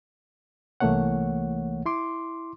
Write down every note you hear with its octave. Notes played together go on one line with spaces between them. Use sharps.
C2 E3 A3 A#3 C#5 F#5
E4 C6 D6